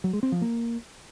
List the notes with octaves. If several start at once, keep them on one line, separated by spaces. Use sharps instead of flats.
F#3
G#3
C4
F3
A#3